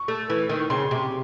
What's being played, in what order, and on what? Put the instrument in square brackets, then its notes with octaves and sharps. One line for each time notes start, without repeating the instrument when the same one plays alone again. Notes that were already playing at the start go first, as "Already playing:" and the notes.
Already playing: [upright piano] C#6
[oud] A3
E3
D#3
[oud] C#3 [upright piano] C6
[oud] C3